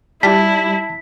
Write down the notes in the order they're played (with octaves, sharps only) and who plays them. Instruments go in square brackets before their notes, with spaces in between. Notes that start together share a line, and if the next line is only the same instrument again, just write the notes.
[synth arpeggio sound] G3 [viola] E4 [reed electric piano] A5 [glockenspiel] B6